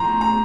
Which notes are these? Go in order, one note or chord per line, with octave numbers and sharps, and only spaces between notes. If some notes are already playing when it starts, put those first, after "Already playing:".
Already playing: A2 F3 A#5 C6
A#5